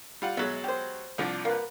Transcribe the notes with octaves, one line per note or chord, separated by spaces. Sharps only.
G3 F4 F#5
B2 F#3 G#3 E5
G4 C5
C2 F3 D4
A#3 B4